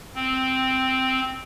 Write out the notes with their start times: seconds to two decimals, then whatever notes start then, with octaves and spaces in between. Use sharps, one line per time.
0.15 C4